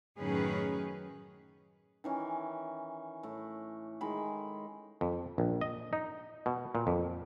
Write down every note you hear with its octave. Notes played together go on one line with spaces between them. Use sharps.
F#2 A2 D#3 C#4 G#4 B4
D#3 E3 C#4
A2
D#3 G#3 B5
F2
A#1
D#5
D#4
B2
A#2
F2